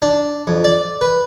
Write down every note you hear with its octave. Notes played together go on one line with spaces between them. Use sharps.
D4
F2
D5
B4